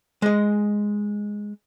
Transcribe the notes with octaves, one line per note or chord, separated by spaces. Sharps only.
G#3 D#5